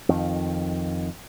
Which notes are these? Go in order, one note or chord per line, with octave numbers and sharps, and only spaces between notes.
F2 D#3